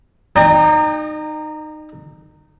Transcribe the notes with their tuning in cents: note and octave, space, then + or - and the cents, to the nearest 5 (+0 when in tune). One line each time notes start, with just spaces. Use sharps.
D#4 -15 D#5 -45 G5 +30